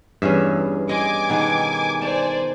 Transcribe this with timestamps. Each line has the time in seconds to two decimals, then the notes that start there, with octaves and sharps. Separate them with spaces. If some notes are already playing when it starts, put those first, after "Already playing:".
0.22 E2 G2 C#4 G#4 E5
0.89 D#5 G#5 C6 D6
1.29 B2 D#3 G#4
2.02 C5 D5 G#5 A5